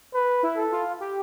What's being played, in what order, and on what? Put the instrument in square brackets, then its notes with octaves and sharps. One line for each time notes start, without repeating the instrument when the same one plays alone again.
[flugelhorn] B4
[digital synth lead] E4
[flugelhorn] A4
[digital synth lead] F4
G4